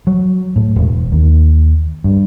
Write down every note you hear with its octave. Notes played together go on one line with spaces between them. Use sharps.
F#3
A2
E1
D#2
G2